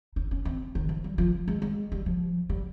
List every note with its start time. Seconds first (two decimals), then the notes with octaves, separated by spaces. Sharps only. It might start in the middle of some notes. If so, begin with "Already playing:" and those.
0.16 D#4
0.31 C#4
0.45 C4
0.75 D#3
0.89 F3
1.04 G3
1.18 F3
1.48 G#3
1.62 G#3
1.92 G3
2.06 F3
2.49 G3